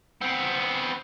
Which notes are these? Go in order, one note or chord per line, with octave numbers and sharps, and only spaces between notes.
B3 C4